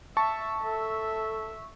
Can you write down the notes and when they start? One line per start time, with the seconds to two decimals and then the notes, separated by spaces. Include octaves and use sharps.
0.17 E5 A5 C#6
0.62 A4 E5